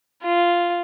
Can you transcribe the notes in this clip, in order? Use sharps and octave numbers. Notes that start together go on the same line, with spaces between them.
F4